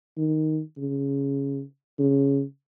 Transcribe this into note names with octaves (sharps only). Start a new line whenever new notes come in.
D#3
C#3
C#3